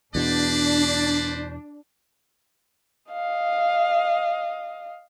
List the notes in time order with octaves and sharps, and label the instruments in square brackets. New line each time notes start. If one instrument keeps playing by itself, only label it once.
[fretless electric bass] E2 B2 [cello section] D4 [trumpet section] B4 C5 D5
[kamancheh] D#5 F5